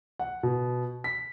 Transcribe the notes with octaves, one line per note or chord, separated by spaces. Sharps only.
F#5
B2
B6